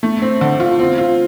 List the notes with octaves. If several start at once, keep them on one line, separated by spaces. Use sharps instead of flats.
A3
C4
D3
F4
C4
F4